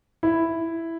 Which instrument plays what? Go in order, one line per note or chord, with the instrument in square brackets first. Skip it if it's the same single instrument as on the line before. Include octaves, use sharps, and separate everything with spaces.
[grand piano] E4